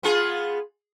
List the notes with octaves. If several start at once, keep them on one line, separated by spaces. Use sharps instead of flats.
B3 F4 G#4